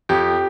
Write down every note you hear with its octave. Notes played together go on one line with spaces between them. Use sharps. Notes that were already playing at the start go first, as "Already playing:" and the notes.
F2 G4